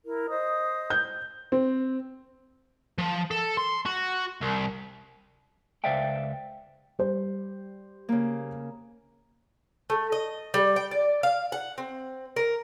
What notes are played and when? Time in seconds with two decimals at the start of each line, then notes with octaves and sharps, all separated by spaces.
0.05 E4 A#4
0.28 C5 D#5 D#6
0.90 G6
1.52 C4
2.98 F3
3.31 A4
3.57 C6
3.86 F#4
4.41 C2
5.84 C#2 C5 D5 E5 F5 G5
6.99 G3 C5
8.09 C#3 A#3
9.90 A3
10.12 D#5
10.54 G3
10.76 G5
10.91 D5
11.23 F5
11.52 F#5
11.78 C4
12.36 A#4